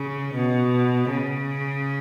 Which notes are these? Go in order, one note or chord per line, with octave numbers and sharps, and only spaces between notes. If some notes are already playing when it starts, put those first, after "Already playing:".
Already playing: C#3
B2
C#3